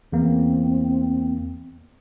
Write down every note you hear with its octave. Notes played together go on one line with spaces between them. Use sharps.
E2 A#3 C4